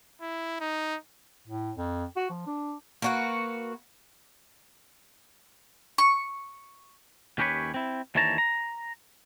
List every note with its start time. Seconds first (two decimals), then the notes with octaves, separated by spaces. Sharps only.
0.21 E4
0.60 D#4
1.48 A2
1.77 F2
2.17 F#4
2.30 F3
2.47 D4
3.02 A#3 F#4 B4
5.98 C#6
7.38 D#2 C#4 G4 B4 C#5
7.74 C4 E4
8.15 D#2 E3 D4 C#5 A5 A#5
8.38 A#5